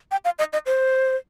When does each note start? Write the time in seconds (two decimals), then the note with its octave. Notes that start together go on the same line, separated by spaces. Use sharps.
0.11 G5
0.25 F5
0.39 D#5
0.53 D#5
0.66 C5